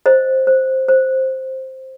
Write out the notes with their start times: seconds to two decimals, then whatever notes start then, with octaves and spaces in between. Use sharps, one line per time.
0.06 C5 D#5
0.47 C5
0.88 C5